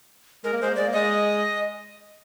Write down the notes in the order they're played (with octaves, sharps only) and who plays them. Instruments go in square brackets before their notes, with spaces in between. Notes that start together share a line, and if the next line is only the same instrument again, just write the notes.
[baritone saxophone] G#3 [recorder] A#4
[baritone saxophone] A#3
[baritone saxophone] G#3 [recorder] C5
[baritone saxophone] A#3
[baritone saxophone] G#3 [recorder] D5
[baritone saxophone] A#3
[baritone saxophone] G#3 [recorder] D#5